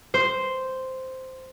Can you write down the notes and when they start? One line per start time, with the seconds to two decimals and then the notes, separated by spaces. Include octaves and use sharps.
0.14 C5